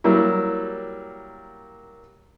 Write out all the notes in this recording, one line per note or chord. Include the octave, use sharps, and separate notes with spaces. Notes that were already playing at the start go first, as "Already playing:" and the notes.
F#3 G3 A#3 E4